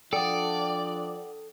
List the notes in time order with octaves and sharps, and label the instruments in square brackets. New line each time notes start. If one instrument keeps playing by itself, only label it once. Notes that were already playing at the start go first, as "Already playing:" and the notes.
[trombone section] F3 D4 [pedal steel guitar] A4 D#6 [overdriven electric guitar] D5 [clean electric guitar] F#5 G5